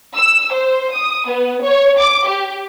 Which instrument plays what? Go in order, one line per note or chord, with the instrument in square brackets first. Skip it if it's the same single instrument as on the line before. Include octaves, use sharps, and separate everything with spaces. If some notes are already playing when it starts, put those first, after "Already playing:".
[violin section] E6
C5
D#6
B3
C#5
D6
G4